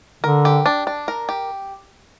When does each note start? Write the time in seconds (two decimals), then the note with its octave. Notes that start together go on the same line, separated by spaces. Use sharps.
0.24 D3 A#4
0.45 G4
0.66 D4
0.87 D4
1.08 A#4
1.29 G4